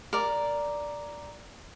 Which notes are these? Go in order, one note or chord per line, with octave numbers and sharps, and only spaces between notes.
A#4 D5